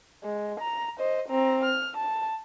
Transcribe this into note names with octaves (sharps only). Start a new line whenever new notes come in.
G#3
A#5
C5 D#5
C4 A#5
F6
A5